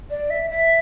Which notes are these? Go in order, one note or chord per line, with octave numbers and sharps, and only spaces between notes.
D5
E5
E5